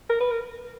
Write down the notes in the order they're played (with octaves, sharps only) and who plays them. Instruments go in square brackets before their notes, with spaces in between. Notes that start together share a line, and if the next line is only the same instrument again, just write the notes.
[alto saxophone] A#4
B4
A#4